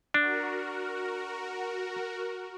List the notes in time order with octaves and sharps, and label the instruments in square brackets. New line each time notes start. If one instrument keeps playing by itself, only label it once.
[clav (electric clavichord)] D4 [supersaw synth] F#4 A#4